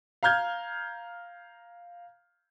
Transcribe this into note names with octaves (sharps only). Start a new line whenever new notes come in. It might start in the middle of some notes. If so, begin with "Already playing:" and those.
F5 A#5 F6 G6 G#6